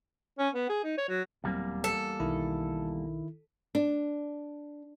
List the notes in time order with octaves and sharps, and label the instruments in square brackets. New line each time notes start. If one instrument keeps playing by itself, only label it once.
[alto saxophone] C#4
B3
G#4
D#4
C#5
F#3
[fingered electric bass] D#1 F#3 C4 [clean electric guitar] E2 G3 A#3
[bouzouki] A4
[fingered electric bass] B1 [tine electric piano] D#3 E4
[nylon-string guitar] D4